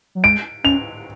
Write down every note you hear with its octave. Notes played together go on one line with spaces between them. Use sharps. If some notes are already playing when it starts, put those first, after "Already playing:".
F#3
G#3 D7
C#4 F7